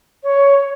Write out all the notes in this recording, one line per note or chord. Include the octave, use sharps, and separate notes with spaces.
C#5